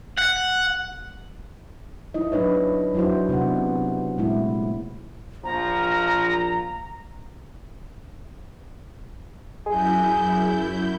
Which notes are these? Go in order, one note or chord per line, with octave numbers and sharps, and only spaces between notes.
F#5
D#4 E4 D#5
F#3 D4 D#4 B4 C#5
F#3 D4 E4 F#4 C5
C3 B3 D4 F#5
A#2 G#3 A3 E4
A#1 F3 A#5
F#2 E4 G#4 G6